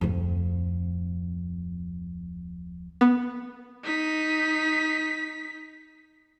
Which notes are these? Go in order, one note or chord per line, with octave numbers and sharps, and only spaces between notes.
D1 F2
B3
D#4 B6